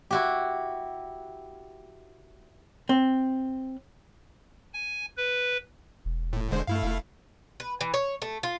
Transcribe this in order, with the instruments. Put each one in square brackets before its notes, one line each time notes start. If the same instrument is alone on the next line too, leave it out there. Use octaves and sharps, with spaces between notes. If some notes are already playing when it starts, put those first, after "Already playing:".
[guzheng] E4 F#4 G4
[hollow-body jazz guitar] C4
[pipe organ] G#5
B4
[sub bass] E1
[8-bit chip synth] A2
[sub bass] E1 [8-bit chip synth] D3 G#3 C5
[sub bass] G2 [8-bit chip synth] A3 E4 F5
[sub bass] F1
[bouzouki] B4
E3
C#5
A3
F4